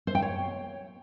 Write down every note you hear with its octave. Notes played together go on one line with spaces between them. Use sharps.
C5
G5
C#5